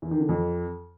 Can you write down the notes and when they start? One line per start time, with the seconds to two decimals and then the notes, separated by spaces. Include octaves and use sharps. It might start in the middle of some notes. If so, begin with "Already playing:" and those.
0.02 E2
0.11 D#3
0.20 D3
0.29 F2